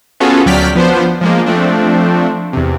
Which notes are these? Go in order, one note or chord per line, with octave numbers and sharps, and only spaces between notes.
B3 C#4 F4 F#4 G#4 A4
D2 F#3 D5 G5 F6 B6
F3 B3 D4 C5
F3 G#3 A#3
F3 A3 C4 D4
E2 C3